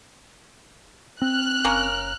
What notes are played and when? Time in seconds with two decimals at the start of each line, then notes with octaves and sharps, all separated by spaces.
1.22 C4 F6 F#6
1.65 F#1 A#3 C#4 A#4